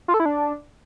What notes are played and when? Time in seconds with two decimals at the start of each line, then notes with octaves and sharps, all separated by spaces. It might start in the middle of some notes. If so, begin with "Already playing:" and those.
0.08 F4
0.14 A4
0.20 E4
0.25 D4